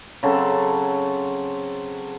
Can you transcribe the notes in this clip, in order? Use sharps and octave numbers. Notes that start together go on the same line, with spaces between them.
C#3 F#3 C4 A4